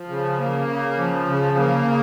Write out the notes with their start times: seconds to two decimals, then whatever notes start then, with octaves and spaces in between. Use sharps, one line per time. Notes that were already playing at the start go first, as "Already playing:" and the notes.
Already playing: F3
0.09 C#3
0.38 A#3
0.67 C#3
0.98 F3
1.28 C#3
1.57 A#3
1.87 C#3